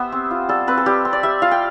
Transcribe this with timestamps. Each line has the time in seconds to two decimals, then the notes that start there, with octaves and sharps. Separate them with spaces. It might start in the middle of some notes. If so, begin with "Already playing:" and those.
Already playing: B3 G4 C5 E5
0.12 C4
0.31 F4
0.49 G3 A4
0.67 C4 B4
0.78 A4
0.86 G3 G4
1.05 C4
1.13 D5
1.23 G3 E5
1.42 F4 F5
1.51 G5